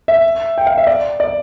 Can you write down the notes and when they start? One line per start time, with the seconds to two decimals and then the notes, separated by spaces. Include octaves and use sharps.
0.08 E5
0.58 G5
0.67 F5
0.78 E5
0.87 D5
1.20 D5